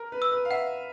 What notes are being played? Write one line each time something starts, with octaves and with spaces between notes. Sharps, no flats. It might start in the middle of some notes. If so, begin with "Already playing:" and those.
Already playing: A#4
B4
E6
B4
F5
E5 F#5